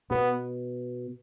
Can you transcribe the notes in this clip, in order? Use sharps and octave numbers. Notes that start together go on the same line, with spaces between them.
B2 B3